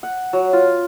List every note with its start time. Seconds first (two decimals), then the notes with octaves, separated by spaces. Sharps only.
0.03 F#5
0.33 F#3
0.53 F4